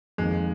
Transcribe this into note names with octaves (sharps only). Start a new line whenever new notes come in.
F2 D#3 G#3 A#3